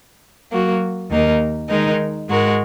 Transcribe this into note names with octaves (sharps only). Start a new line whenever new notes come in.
F#3 A#3 F#4
D#2 D#3 A#3 D#4 A#4
D#3 G#3 D#4 A#4
G#2 G#3 F#4 A#4